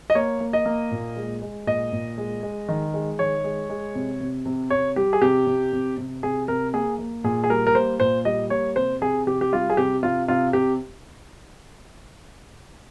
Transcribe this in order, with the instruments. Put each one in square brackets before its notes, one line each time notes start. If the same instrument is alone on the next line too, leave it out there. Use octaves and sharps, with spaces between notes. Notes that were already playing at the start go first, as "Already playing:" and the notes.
[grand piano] D#5
A#3 C#5
A#3
D#5
A#3
A#2
G#3
G#3
A#2 D#5
A#2
G#3
G#3
D#3
G#3
D#3 C#5
G#3
G#3
C3
C3
C3
C3 C#5
G3 G4
G#4
C3 G4
C3
C3
C3
C3 G#4
C3 A#4
A#3 G#4
A#3
A#2 G#4
G#4
G3 A#4
A#4
A#3 C5
A#2 C5
G3 D#5
A#3 C#5
C3 C5
C3 G#4
C3 G4
G4
G3 F4
G#4
C3 G4
C3 F4
C3 F4
C3 G4